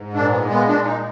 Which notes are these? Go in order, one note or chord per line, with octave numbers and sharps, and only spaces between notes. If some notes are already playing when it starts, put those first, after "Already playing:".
Already playing: G#2
A#2 D4
B3
G#3
B3
A#2 D4
D#4
G#3